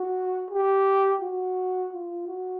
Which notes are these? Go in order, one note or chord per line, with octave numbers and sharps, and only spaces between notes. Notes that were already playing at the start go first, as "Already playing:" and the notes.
Already playing: F#4
G4
F#4
F4
F#4